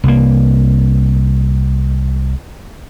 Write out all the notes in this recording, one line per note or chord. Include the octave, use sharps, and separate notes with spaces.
C2 A#3